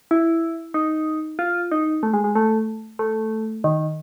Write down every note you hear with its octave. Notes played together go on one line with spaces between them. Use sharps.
E4
D#4
F4
D#4
A3
G#3
G#3
A3
A3
D#3